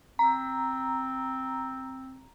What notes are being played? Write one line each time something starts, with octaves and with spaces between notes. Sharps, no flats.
C4 A#5